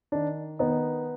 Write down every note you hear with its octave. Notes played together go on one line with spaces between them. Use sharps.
D#3 D4
D#3 B3 D#4